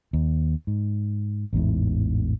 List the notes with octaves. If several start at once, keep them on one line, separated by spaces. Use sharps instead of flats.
D#2
G#2
A1 E2 G#2